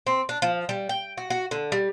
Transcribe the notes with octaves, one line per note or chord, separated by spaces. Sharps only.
C4
D4
F3
G3
G5
F#4
F#4
D3
G3